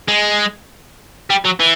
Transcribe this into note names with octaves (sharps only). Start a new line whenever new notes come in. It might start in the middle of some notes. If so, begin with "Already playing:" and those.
G#3
G3
F#3
E3